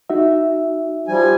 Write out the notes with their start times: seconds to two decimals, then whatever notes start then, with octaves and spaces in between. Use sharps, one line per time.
0.10 D#4 F#4 E5
1.08 F3 G3 G#5